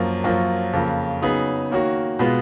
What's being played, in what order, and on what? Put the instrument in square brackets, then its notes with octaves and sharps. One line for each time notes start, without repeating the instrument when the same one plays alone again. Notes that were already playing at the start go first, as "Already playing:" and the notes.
Already playing: [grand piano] F#2 F3 A#3
F#2 F3 A#3 C#4
F2 C#3 F3 A#3
C#3 F#3 B3 D#4 G#4
D#3 A#3 C#4 F#4
B2 G#3 B3 F4